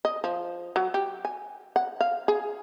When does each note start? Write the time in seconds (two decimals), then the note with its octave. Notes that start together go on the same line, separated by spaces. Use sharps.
0.05 D#5
0.24 F3
0.76 F#3
0.94 G4
1.25 G#5
1.76 F#5
2.01 F5
2.28 G#4